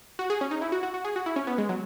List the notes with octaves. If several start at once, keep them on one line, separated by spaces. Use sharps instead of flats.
F#4
G#4
C#4
D#4
E4
F#4
F#4
F#4
G#4
F#4
E4
C#4
B3
G#3
F#3